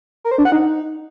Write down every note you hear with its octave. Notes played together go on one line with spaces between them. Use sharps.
A#4
C5
D4
F#5
D#4